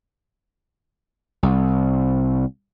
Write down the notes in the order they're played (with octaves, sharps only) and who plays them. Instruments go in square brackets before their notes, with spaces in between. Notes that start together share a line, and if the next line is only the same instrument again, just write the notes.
[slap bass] C2